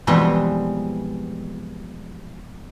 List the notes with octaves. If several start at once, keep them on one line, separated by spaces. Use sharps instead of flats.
F2 B2 E3 G3 G#3 B3